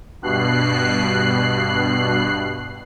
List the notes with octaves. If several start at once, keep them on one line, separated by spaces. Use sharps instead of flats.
G2 B2 F#6 C7